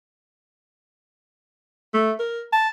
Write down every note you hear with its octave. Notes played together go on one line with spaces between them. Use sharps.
A3
A#4
A5